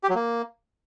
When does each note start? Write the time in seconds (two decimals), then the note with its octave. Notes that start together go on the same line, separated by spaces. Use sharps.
0.03 G4
0.09 F#3
0.15 A#3